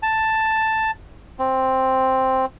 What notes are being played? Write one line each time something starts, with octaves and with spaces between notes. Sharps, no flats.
A5
C4